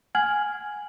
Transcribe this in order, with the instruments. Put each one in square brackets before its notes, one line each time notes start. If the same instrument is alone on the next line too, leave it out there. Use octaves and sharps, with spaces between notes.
[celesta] F#5 G#5 F6 G#6 F#7